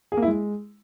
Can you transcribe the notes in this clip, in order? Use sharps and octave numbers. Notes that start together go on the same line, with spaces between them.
G#4
A#3
E4
G#3